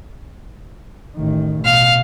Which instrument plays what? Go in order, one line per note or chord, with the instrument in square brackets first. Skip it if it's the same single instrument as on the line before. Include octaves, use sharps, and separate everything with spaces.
[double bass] A1 D#3
[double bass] B2 [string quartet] F5